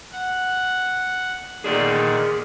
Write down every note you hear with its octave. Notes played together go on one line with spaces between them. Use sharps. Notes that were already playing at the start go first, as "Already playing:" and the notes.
F#5
A#2 D3 D#3 G#4 D5